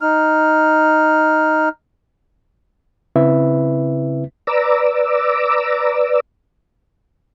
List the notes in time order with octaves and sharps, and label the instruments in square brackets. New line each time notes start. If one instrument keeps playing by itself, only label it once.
[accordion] D#4 F6
[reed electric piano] C#3 C4 E4 B4 E5
[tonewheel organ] B4 D5 A#5 D6 E6